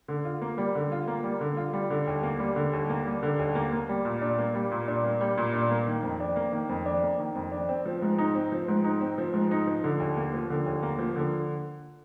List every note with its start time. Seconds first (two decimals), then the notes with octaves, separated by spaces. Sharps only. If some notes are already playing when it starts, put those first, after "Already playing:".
0.08 D3
0.25 F4
0.42 A#3
0.58 G3
0.75 D3
0.92 F4
1.07 A#3
1.24 G3
1.41 D3
1.57 F4
1.73 G3
1.90 D3
2.07 D#2
2.23 A#3
2.40 G3
2.56 D3
2.73 D#2
2.89 A#3
3.07 G3
3.23 D3
3.39 D#2
3.55 A#3
3.73 A#3
3.89 G3
4.05 A#2
4.21 D4
4.38 A#3
4.55 G3
4.72 A#2
4.88 D4
5.04 A#3
5.21 G3
5.38 A#2
5.53 D4
5.71 A#3
5.87 D#3
6.03 F2
6.20 D4
6.36 A#3
6.53 D#3
6.69 F2
6.86 D4
7.03 A#3
7.19 D#3
7.35 F2
7.52 D4
7.69 C4
7.86 F3
8.02 G#2
8.18 D#4
8.35 C4
8.52 F3
8.68 G#2
8.84 D#4
9.01 C4
9.18 F3
9.33 G#2
9.51 D#4
9.67 F3
9.84 D3
10.00 D#2
10.17 A#3
10.34 F3
10.50 D3
10.66 D#2
10.83 A#3
10.99 F3
11.16 D3